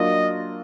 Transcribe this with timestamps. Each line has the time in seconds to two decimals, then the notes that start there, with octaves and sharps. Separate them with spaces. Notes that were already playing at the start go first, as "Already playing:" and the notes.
Already playing: F#3 A#3 D4 F4 D#5